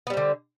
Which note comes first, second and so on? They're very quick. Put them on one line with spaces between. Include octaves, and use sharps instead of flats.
B3 G3 C4 D3